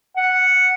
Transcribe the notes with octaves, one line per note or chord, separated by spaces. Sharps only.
F#5